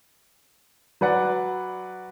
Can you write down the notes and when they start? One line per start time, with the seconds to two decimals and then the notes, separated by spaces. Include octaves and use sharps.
1.01 F#3 B4 D5 F#5